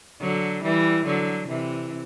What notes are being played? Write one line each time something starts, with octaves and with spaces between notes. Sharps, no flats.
D3 F#3
E3 G3
D3 F#3
C3 E3